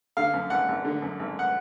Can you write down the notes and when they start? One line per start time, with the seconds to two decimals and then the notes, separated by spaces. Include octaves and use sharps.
0.17 D3 F5
0.34 F#2
0.50 G#1 F#5
0.68 G#1
0.85 D3
1.02 F#2
1.19 G#1
1.39 F#5